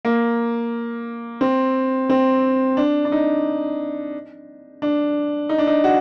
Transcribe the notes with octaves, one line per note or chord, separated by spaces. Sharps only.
A#3
C4
C4
D4
D4
D#4
D4
D#4
D4
D#4
F#4